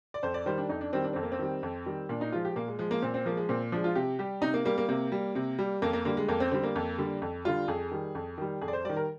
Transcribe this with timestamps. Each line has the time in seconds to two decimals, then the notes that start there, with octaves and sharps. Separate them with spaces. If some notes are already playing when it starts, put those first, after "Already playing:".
0.14 D5
0.23 F2 C5
0.34 D5
0.46 D#3 G3 C5
0.58 D4
0.69 F2 D#4
0.81 D4
0.93 D#3 G3 C4
1.04 D4
1.13 F2 C4
1.23 A#3
1.32 C4
1.39 D#3 G3
1.63 F2
1.86 D#3 G3
2.09 A#2 D4
2.21 D#4
2.32 F3 G#3 F4
2.45 G4
2.56 A#2 A#3
2.68 G#3
2.79 F3 G#3
2.91 A#3
3.02 A#2 C4
3.14 C4
3.26 F3 G#3 A#3
3.37 G#3
3.49 A#2 C4
3.72 F3 G#3 D4
3.84 F4
3.95 C3 G4
4.19 G3 G4
4.42 C3 D#4
4.54 A#3
4.65 G3 A#3
4.78 A#3
4.88 C3 A#3
5.12 G3
5.35 C3
5.59 G3
5.82 F2 A#3
5.93 A#3
6.05 D3 G3 A#3
6.17 G#3
6.28 F2 A#3
6.40 C4
6.51 D3 G3 C4
6.63 A#3
6.76 F2
6.98 D3 G3
7.22 F2
7.45 D3 G3 F4
7.68 F2 G#4
7.91 D#3 G3
8.15 F2
8.38 D#3 G3
8.62 F2 G#4
8.68 D5
8.73 C5
8.85 D#3 G3 D5
8.97 A#4